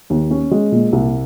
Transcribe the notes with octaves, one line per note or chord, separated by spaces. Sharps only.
D#2
C#4
G#3
A#2
C2